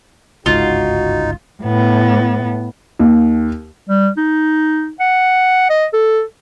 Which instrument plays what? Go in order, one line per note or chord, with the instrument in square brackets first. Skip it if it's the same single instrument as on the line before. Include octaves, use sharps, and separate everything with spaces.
[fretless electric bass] G1 C#2 G#2 [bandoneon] D#4 [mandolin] F4 [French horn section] F#4
[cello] A2 B3
[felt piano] D#2
[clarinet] G3
D#4
F#5
D#5
A4